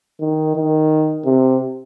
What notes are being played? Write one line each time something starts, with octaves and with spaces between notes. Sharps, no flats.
D#3
D#3
C3